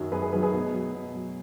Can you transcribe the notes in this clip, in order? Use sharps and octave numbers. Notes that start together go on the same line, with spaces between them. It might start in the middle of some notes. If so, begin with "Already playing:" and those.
Already playing: F#2 D#3 F#3
F#2 G#4 B4
G#4 B4
D#3 F#3 G#4 B4
G#4 B4
B2
F#3
B2
F#3